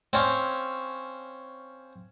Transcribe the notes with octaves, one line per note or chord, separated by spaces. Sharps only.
C4 C#4 F5